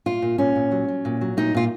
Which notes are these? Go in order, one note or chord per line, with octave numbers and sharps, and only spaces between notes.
A#2 F4
A#2
A#2 C#4
A#2
F#3
F#3
A#2
F#3
A#2 D#4
A#2 F4